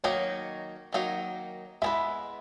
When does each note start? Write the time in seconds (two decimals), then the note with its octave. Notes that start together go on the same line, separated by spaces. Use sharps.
0.04 D#3 F#3 A#3 D#4 C#5
0.93 D#3 F#3 A#3 D#4
1.82 G#3 B3 E4 G#4 B4 E5